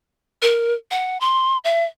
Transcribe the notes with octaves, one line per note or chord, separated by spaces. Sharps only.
A#4
F#5
C6
E5